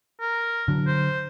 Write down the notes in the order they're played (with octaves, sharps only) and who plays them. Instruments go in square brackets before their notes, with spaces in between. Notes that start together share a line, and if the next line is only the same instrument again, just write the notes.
[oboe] A#4
[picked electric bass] D3 F#3
[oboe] C5